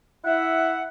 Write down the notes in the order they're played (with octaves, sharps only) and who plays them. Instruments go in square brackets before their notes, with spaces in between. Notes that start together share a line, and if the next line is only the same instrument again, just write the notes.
[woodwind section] E4 E5 F#5